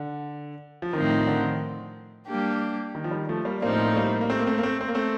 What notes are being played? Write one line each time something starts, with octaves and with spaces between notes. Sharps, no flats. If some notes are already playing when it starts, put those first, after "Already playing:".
Already playing: D3
F3
A2 D#3 F3 C4 D#4 A#4
D#3
D3
D#3
G3 A#3 D4 G4
D#3
F3
D#3 G3
F3 A3
G3 A#3
A2 F3 A#3 C4 D4 D#4
A3
G3 A#3
A#3
A3 C4
A#3
A3 C4
A#3
A3 C4
C4
A#3
A3 C4